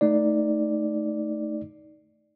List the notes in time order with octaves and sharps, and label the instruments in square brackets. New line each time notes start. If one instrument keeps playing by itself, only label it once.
[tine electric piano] A3 D#4 D5